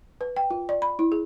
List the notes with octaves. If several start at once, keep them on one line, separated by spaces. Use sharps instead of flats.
B4
G5
F4
D5
B5
E4
G#4